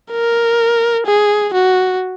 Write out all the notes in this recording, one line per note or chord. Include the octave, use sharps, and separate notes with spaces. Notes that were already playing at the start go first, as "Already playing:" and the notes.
A#4
G#4
F#4